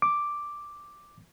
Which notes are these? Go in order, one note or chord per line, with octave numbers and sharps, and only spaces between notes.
D6